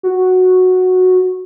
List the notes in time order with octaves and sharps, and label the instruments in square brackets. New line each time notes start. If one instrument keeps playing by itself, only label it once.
[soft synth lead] F#4